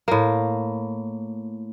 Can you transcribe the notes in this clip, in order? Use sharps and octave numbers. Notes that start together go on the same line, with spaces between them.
A2 A#3